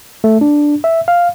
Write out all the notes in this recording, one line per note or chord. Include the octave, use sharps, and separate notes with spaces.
A3
D4
E5
F5